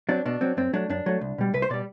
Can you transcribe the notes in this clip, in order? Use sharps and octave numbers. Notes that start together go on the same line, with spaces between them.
F#3 C4 D4
B2 D4
F#3 C4
F#2 C4
F#3 A3 D4
F#2 D4
F#3 A3
C2
B2 G3
C2 B4
C5
B2 G3 D5